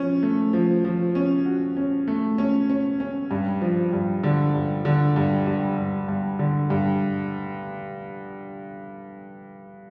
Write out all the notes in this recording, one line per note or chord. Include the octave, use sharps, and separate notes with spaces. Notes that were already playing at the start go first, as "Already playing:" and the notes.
Already playing: F3 C#4
A3
F3
F3
C#4
F#4
C#4
A3
C#4
C#4
C#4
G2
F3
G2
D3
G2
D3
G2
G2
G2
G2
D3
G2